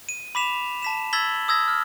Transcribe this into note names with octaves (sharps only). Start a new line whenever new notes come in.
D#7
B5 D6 B6 E7 F7
A5 B6 E7
E6 G#6 A6 B6 F#7 G7
D#6 E6 G#6 A#6
F6